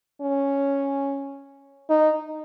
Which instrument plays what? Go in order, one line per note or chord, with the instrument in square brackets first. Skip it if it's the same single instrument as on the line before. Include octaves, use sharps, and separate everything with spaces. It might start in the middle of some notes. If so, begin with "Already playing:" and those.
[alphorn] C#4
D#4